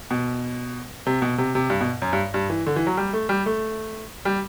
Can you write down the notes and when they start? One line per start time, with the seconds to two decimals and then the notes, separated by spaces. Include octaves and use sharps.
0.11 B2
1.06 C3
1.22 B2
1.38 C3
1.55 C3
1.70 G2
1.81 B2
2.02 F#2
2.13 G2
2.34 G2
2.50 E3
2.67 D3
2.76 E3
2.87 F#3
2.97 G3
3.13 A3
3.29 G3
3.46 A3
4.25 G3